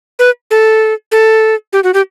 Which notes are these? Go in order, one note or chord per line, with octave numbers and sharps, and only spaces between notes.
B4
A4
A4
G4
F#4
G4